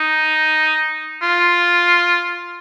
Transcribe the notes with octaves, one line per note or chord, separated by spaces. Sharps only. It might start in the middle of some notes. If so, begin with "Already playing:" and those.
Already playing: D#4
F4